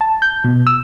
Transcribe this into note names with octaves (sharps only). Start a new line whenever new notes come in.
A5
G6
B2
E6